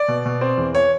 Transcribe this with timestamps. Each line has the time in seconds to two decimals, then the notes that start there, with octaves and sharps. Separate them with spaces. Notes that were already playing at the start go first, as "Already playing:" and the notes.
Already playing: D5
0.08 B2
0.26 B2
0.41 C4
0.57 E2
0.75 C#5